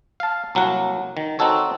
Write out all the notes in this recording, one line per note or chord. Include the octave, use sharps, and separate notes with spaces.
F5 A5
C2 F#3 A#3 F#5
D#3
C4 D#4 F#4 A4 C#5